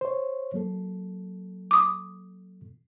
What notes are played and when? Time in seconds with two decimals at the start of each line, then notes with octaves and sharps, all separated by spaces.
0.01 C5 C#5
0.54 F#3 A#3 A4
1.71 D6 D#6